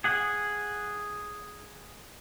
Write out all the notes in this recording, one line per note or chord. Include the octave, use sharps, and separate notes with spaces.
G#4 F#5